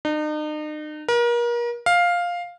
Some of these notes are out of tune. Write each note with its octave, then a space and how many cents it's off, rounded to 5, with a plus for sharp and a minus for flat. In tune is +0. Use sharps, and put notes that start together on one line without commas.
D#4 -40
A#4 +35
F5 +5